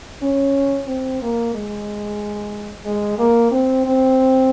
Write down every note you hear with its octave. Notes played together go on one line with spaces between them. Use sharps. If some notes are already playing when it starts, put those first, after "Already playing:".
C#4
C4
A#3
G#3
G#3
A#3
C4
C4